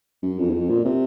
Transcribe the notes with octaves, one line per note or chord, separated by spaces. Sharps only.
F#2
F2
E2
F2
A#2
C3